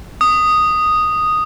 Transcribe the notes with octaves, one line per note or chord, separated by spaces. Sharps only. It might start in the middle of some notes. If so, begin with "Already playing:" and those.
D#6